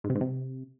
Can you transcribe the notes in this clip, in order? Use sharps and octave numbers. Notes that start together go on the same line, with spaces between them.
G#2
C3
G#2
C3